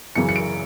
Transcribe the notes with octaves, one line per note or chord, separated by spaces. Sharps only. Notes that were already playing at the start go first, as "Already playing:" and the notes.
F#2 C#3 E3 C#7
C#7
D7